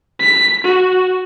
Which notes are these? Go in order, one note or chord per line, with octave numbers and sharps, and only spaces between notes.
B6
F#4